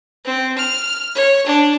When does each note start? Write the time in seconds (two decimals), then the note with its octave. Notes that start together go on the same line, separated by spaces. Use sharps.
0.25 C4
0.57 F6
1.15 C#5
1.46 D4